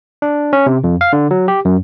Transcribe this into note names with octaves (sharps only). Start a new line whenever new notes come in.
D4
C#4
C3
F2
F5
D3
F#3
G4
F#2